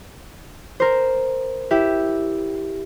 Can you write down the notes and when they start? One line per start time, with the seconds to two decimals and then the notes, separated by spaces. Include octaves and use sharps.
0.80 A#4 C5
1.71 E4 G4 E5